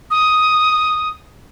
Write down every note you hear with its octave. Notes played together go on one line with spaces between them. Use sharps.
D#6